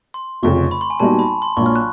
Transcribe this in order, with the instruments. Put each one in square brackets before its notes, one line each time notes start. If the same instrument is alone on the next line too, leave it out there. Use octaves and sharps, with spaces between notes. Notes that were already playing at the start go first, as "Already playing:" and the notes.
[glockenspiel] C6
[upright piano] F1 F2 C#3 [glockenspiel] C#6
[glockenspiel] B5
C6
G#5
[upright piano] A#2 G3 B3 D#4 F#4 [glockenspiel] A5
[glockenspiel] B5
C6
[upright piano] A#1 A#2 F#3 [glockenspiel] C#6
[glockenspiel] F6
F#6